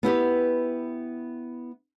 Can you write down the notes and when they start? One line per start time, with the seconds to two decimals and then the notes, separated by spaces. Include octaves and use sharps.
0.03 B3 E4 G4 B4